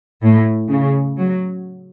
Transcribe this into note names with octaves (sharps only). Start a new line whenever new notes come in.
A2
C#3
F#3